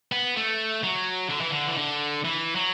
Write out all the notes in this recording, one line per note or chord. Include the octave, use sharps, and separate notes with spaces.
B3
A3
F#3
D3
E3
D3
E3
D3
E3
F#3